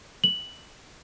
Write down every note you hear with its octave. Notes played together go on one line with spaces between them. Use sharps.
F#7